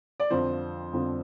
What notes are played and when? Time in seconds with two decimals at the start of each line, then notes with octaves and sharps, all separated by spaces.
0.20 D5
0.31 F2 D3 F3 C4 C5
0.93 F2 D3 F3 C4